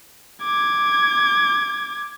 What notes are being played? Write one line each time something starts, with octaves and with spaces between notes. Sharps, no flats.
D6 G#6